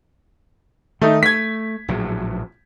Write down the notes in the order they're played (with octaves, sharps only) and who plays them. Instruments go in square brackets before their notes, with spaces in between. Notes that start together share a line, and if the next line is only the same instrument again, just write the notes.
[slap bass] D#3 [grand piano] A3 D#4
[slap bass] A3 [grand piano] G#6 B6
[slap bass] A#1 A2 F#3